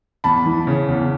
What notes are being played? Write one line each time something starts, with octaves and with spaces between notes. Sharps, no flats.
E2 A5 B5
E3
C#3
E2